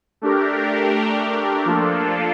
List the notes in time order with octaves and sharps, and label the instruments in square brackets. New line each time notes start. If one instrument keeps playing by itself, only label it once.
[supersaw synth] A3 D4 G4 A#4
F3 A#3 D4 F4 A4